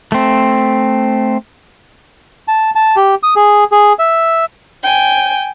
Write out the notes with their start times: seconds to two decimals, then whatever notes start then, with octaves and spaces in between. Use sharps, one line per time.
0.12 A3 C4
2.48 A5
2.75 A5
2.96 G4
3.23 D#6
3.36 G#4
3.72 G#4
3.99 E5
4.83 G5 G#5